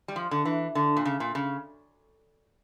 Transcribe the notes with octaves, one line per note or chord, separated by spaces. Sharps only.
G3
F3
D3
E3
D3
A#2
C#3
A#2
C#3